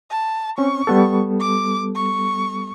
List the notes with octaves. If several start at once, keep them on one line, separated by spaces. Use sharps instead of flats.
A5
C4 C#4 C#6
G3 B3 A4
D6
C#6